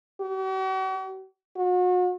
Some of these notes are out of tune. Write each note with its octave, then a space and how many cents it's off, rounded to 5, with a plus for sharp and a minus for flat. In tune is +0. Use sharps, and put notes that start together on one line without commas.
F#4 +45
F#4 -40